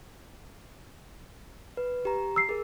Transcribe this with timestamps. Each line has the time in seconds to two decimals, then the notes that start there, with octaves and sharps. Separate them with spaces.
1.77 B4
2.05 G4 A#5
2.36 E6 C7
2.49 G#4 A#4